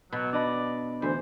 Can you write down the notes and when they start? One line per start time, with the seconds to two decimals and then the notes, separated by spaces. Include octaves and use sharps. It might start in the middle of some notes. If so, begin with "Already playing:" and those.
0.12 B2 F#3
0.33 D4 D5 D#5 B5
1.02 D2 E3 C5